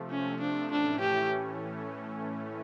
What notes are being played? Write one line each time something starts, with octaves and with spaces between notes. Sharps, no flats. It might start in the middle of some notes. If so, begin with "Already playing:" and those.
Already playing: C3 F3 A3
C#4
D4
A2 E3 A3 C#4 D4
G4